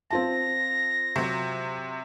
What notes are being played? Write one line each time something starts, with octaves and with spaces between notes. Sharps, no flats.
C4 F4 A5 A#6
C3 F#3